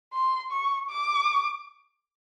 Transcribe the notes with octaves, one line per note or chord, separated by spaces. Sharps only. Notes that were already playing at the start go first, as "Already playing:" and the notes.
C6
C#6
D6